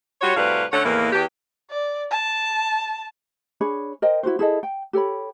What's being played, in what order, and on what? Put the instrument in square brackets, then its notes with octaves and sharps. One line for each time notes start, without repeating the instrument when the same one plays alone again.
[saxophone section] G3 F4 F#4 C#5
A2 C3 G3 F#4 B4 F5
D3 A3 C#4 C#5 F#5
E2 A2 D#3 E3 A#3
E2 G4
[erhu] D5
A5
[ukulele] D4 G#4 C#5 B5
A#4 C5 D#5 G5
E4 F#4 A#4 C5
E4 G#4 A4 D#5
G5
G4 A4 C#5 B5